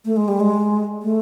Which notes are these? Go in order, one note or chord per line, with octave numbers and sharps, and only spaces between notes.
A3
G#3
G3
G#3
A3